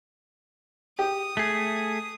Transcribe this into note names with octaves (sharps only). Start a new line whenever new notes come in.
G4 D#6
A3 G#4